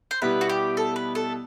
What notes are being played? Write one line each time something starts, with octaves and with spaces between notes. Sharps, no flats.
C5
B2 G3 B3 E4 B4
F#4
G4
A4
B4
A4